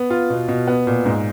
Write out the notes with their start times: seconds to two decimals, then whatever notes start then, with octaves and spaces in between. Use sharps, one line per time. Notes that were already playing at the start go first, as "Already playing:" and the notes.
Already playing: B3
0.10 F4
0.30 B2
0.48 B2
0.67 B3
0.87 A#2
1.05 G#2